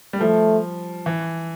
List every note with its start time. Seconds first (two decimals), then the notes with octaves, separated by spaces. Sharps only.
0.13 G3
0.20 F3 A3
1.06 E3